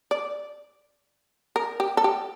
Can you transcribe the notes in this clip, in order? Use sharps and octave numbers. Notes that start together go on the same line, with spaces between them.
D5
A#4
G4
A4
G4